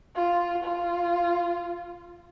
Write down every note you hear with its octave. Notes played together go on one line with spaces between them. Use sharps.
F4
F4